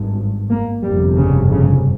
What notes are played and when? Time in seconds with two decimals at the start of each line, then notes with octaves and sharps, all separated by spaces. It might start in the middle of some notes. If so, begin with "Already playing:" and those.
Already playing: G#1 G2
0.50 A#3
0.83 G1 F2 C3 G3
1.18 C#3
1.52 C#3